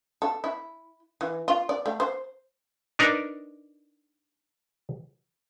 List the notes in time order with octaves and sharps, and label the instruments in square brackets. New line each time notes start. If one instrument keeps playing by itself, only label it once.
[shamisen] A4
E4
E3
F4
D5
A3
C5
[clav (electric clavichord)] D4 D#4 A#4 B4